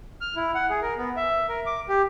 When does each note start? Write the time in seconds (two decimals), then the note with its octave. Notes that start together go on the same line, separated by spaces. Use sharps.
0.21 F6
0.36 E4
0.55 F#5
0.70 G#4
0.82 A#4
0.97 B3
1.17 E5
1.49 A#4
1.66 D6
1.89 G4